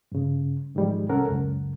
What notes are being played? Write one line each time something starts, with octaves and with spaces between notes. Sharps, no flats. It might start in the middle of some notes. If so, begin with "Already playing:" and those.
G2 C#3
G#2 D#3 F3 G3 G#3
C2 C#4 A4 A#4 F#5
C#2 F#2